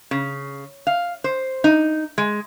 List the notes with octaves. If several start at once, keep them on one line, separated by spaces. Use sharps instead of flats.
C#3
F5
C5
D#4
G#3